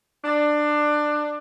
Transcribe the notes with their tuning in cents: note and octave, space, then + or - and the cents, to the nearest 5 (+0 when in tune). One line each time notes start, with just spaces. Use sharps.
D4 +20